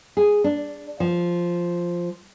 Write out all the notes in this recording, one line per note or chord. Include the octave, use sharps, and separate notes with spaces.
G#4
D4
F3